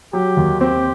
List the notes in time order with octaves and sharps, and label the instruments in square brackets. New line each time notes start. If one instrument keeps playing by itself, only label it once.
[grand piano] F#3 [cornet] G4
[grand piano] D#2
[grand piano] C4 [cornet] G4